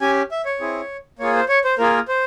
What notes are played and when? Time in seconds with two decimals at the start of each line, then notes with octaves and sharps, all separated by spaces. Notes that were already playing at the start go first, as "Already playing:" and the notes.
0.01 C#4 G4 G#5
0.31 E5
0.45 C#5
0.60 C4 E4 G#4
1.19 A#3 F4 G#4 C#5
1.34 C5
1.49 C#5
1.64 C5
1.78 A#3 F4 G#4 A#4
2.08 C5